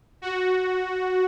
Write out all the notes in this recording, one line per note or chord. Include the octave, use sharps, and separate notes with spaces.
F#4